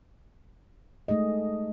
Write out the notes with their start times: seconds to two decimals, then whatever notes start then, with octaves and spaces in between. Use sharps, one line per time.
1.08 G#3 A3 D#4 G#4 D#5